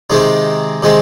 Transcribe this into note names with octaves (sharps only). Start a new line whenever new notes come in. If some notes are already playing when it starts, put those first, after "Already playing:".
C3 D#3 G#3 C4 D#4
C3 D#3 G#3 C4